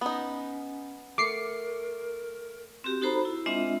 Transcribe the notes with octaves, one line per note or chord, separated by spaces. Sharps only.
B3 C#4 D#4
A3 A#4 D6 C7 C#7
C4 F#4 G4
D#4 F#4 A4 C5 A#5 B5
E4
G#3 C4 D4 F4 D#5 E5